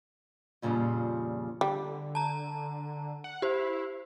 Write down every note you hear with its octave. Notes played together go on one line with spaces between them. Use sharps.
F2 A#2 C#3 F3 G3
D3 G3
A5 A#5
F#5
E4 G4 C5